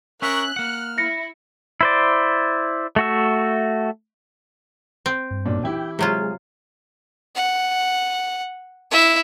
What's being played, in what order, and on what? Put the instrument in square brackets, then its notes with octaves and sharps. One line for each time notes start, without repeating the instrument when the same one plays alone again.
[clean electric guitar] C#4 E5 [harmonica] A#4 C#6 [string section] F#6
[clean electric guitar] A#3 F#5 [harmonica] F6
[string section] E4 [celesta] A#6 C#7
[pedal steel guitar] E4 C5 D5
A3 F#4 E5
[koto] C4
[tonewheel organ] G2
[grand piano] B1 A#2 D4
[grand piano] E3 E4 G4 [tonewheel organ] G5
[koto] C3 F#3 F4 [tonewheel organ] G#3 G#4
[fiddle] F#5
E4 E5